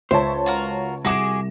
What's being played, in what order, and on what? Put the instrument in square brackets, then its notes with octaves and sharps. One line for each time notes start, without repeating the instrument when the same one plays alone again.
[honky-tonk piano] C#2 C#5 A5 [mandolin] E4 [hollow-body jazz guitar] C5
[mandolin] F4 F#4 A#4
[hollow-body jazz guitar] C2 [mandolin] F#4 G#4 D6 [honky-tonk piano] A#6 E7